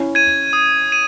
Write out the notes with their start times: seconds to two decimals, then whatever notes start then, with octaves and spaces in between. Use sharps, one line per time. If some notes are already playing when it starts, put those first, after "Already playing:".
Already playing: C#4 E4
0.15 G#6 D#7
0.53 D#6
0.92 D#7